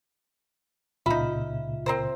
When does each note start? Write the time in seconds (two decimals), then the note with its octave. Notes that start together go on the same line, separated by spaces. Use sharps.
1.06 C#2 A#2 C#3 D#4 F4 E5 B5
1.86 C4 A#4 C5